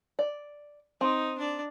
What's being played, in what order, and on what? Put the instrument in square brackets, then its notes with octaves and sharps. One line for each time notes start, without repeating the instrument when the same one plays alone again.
[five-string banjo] D5
[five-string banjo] C4 [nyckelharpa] D#4
[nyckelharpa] D4 D5